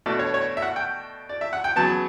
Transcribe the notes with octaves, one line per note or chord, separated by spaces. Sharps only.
B2 A3 D4 D5
C#5
C#5
E5
F#5
G5
D5
E5
F#5
G5
C#3 F#3 B3 A5